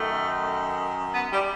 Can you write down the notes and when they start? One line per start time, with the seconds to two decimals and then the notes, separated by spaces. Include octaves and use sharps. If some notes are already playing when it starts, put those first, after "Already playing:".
Already playing: F#2 D#3 A3
1.13 B3
1.31 G3